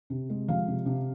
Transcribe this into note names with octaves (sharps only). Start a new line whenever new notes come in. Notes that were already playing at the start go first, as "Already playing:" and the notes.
C3
G#3
F3 F5
C3
C3